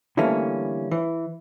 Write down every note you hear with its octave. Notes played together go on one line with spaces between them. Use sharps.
D3 E3 G3 A3 A#3 C#4
E3